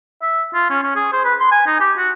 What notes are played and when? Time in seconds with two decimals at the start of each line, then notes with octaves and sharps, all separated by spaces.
0.22 E5
0.54 F4
0.70 C#4
0.83 C#4
0.96 G#4
1.13 C5
1.24 B4
1.40 C6
1.52 G#5
1.67 D#4
1.80 G4
1.97 F#4